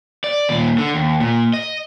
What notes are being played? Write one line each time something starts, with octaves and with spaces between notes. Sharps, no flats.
D5
D#2 A#2
D3
D#2
A#2
D#5